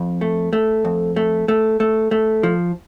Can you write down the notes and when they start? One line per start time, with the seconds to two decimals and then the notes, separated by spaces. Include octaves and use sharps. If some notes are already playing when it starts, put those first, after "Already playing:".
Already playing: F2
0.21 A3
0.53 A3
0.85 F2
1.16 A3
1.48 A3
1.80 A3
2.11 A3
2.43 F3